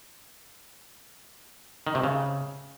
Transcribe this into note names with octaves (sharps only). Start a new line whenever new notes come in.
D#3
C3
C#3